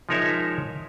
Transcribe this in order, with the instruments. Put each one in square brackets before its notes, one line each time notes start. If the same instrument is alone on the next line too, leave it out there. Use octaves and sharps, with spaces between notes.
[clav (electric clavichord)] F3 G#3 D#4 A#4 C#5 E5